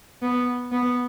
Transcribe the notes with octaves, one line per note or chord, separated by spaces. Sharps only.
B3
B3